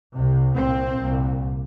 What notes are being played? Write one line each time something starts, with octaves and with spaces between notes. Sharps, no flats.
C2 C3
C2 A#2 C4
C2 A#2